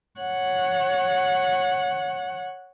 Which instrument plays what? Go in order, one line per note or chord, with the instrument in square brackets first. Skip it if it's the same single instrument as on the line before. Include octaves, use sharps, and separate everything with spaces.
[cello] C#5 F#5